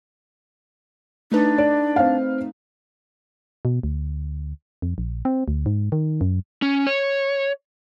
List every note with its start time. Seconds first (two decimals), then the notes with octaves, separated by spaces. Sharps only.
1.32 A3 D4 D#4 B4
1.58 D5
1.96 C4 F5
3.65 B2
3.83 D2
4.82 F2
4.98 A#1
5.25 C4
5.48 D2
5.66 G#2
5.92 D#3
6.21 F#2
6.62 C#4
6.87 C#5